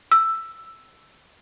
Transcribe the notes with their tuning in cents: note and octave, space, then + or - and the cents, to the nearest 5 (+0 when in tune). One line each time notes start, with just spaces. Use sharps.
E6 +10